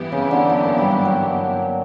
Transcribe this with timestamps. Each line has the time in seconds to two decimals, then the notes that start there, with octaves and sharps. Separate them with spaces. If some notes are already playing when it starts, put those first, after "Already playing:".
Already playing: G2 E3 B3 E4 G4
0.12 C#3
0.31 D3
0.50 F#3
0.63 A#3
0.78 G3
0.91 F#3
1.05 F#3